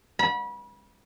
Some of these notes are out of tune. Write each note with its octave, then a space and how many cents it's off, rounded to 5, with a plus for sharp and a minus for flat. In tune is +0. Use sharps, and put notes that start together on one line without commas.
B5 -30